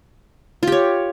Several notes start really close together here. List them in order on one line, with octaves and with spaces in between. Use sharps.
F4 G4 C#5